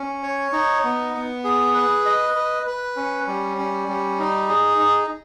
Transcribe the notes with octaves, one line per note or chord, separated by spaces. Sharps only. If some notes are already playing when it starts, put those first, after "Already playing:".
Already playing: C#4
C#5
D#4
B3
B3
G#4
B4
D#5
B4
B4
C#4
G3
C#4
G3
D#4
G#4
D#4